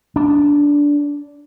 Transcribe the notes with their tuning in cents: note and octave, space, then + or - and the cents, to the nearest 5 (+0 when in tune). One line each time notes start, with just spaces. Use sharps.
D4 -15